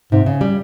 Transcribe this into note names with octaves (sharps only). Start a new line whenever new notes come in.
G#2 C3
C#3
G3